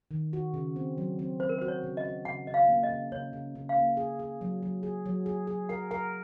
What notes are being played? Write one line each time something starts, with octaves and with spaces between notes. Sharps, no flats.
D#3
F#4
C#3
C4
F#3
C4
C4 C5
A#4
C5
F#4
C#5
C#3
D#5
F#4
C#3 F#5
C#3 D#5
F5
A#3
D#5
C#3
C#3 C#5
C#3
C#3
F5
A#3
G#4
G#4
F#3
F#3
G#4
F#3
G#4
G#4
A#4 F#5
A#4 F#5